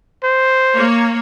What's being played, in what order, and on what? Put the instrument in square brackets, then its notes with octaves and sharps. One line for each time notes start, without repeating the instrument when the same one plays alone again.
[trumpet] C5
[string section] A#3 C#5